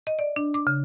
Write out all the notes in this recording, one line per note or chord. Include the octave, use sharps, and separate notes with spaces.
D#5
D5
D4
D6
C#3